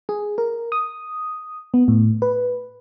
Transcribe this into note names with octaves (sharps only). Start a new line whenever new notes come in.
G#4
A#4
D#6
B3
A2
B4